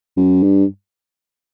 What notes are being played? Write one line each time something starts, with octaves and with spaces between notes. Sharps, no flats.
F#2
G2